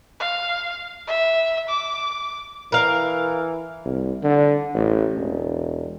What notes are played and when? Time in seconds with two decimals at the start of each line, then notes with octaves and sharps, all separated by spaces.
0.20 F5
1.07 E5
1.69 D6
2.72 E3 A#4 F5
3.85 C2
4.23 D3
4.74 A1
5.15 E1